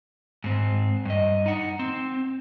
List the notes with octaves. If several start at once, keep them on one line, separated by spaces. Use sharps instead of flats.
G#2 C4
G2 D#5
D#4 F#5
C4